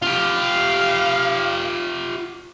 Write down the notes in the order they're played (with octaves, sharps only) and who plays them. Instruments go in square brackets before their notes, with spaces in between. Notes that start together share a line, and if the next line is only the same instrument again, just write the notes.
[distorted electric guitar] F4 G4 [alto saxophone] F5